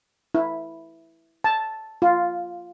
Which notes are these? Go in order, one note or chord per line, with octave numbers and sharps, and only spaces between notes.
E4
A5
F4